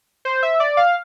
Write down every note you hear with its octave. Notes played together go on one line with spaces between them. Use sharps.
C5
E5
D5
F5